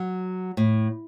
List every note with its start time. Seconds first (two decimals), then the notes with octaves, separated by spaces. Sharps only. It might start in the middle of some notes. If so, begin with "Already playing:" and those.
Already playing: F#3
0.57 A2